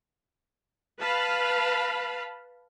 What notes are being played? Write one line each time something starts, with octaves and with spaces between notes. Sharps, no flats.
B4 F5 A5 B5